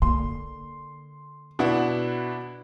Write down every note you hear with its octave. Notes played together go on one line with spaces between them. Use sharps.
D3 A#3 C6
B2 D4 E4 F#5